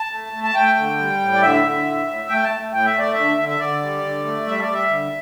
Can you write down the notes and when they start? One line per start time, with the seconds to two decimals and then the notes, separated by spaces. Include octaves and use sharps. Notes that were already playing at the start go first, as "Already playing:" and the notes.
Already playing: A5
0.11 A3
0.33 A3
0.44 A5
0.55 A3 G5
0.77 D3
0.99 G3
1.20 A2
1.33 D5
1.42 D3 E5
1.64 D3
1.85 A2
2.07 A2
2.29 A3 G5
2.44 A5
2.51 A3
2.72 A2 G5
2.86 E5
2.94 A3
2.99 D5
3.13 D3 E5
3.38 D3
3.49 E5
3.59 D3 D5
3.81 G3
4.03 D3
4.25 A3
4.47 G3 E5
4.61 D5
4.68 G3
4.74 E5
4.90 D3